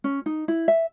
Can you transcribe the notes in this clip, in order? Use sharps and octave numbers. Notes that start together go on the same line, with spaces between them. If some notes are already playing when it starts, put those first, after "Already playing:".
C#4
D#4
E4
E5